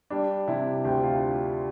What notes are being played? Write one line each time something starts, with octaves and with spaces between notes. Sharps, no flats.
G3 D4
C3 E4
D2 G4
F4